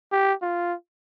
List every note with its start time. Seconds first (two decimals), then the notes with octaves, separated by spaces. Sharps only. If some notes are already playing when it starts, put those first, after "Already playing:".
0.12 G4
0.42 F4